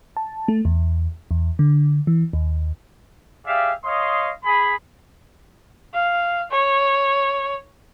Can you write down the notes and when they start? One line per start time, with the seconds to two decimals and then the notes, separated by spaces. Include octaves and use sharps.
0.17 A5
0.48 A3
0.65 E2
1.31 E2
1.59 D3
2.07 E3
2.33 D#2
3.46 G4 G#4 D5 E5 F5
3.84 C#5 D#5 F5 C6 D#6
4.44 G#4 B5
5.94 F5
6.51 C#5